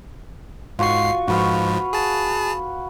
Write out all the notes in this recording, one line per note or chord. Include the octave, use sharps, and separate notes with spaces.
G#2 F4 F#4 C#6 C7
G#2 F3 F#4 B4 F5
G#4 A5